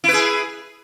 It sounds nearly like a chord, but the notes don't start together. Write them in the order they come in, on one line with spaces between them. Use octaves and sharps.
E4 B4 G#4